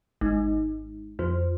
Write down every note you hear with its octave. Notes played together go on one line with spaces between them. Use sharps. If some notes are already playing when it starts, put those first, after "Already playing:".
G#1
F2